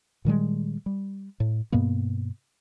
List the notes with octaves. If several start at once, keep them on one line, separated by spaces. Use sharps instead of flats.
A#2 D#3 G3 G#3
G3
A2
G2 B2 A#3 B3